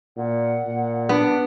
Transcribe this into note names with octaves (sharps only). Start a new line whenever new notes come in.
A#2 F#5
A#2
B3 D4